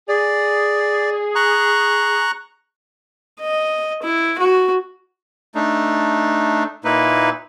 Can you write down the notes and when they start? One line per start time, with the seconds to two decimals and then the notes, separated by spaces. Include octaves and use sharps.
0.09 G#4 D5
1.35 A#5 C#6 F#6
3.41 D#5
4.03 E4
4.39 F#4
5.55 A3 D4 D#4
6.84 A#2 A#3 D#4 E4 B4